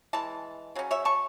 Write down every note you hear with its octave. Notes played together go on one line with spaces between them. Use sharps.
E3 G#3 A5
C#3 F#3 C#4
C#5 E5
A5 C#6